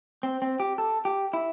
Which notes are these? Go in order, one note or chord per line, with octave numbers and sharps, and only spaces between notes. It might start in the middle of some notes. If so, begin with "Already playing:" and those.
C4
C4
G4
A4
G4
E4